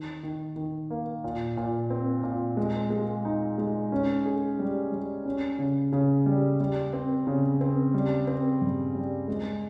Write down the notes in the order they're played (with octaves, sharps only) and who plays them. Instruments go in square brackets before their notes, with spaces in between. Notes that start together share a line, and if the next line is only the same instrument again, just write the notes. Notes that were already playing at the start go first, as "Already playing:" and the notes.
Already playing: [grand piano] D#3
D#3
D#3
A#3
A#2
A#2
C4
A#2
G#3
G#3
D#4
G#3
C#4
G#4
G3
G3
C#4
C#3
C#3
G3
G3
C4
C#3
C4
G3
C4
G2
G3
G#3